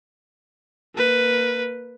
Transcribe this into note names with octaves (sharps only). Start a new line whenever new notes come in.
A#3 B4